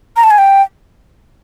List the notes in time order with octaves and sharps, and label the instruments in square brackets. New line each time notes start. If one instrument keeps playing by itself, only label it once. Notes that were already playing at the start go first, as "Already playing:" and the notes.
[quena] A#5
A5
G#5
G5